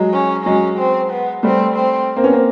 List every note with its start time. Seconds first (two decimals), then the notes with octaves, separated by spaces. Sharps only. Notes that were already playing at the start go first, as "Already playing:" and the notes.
Already playing: F#3 G#3
0.14 C#4
0.45 F#3 G#3 C#4
0.78 C4
1.11 B3
1.43 G3 A3 C4
1.75 C4
2.16 A#3 C4
2.24 B3 C#4
2.32 A#3 C4